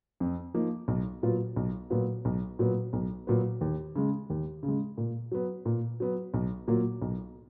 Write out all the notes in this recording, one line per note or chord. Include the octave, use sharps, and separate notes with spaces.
F2
F3 A#3 D#4
B1
A#2 F#3 B3 F4
B1
A#2 F#3 B3 F4
B1
A#2 F#3 B3
B1
A#2 F#3 B3
D#2
C#3 G#3
D#2
C#3
G#3
A#2
F#3 B3
A#2
F#3 B3
B1
A#2 F#3 A#3 F4
B1